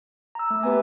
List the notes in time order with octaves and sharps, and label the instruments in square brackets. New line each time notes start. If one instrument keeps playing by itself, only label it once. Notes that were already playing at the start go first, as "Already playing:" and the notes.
[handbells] A#5 E6
A3
[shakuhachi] B3 [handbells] G4 G#5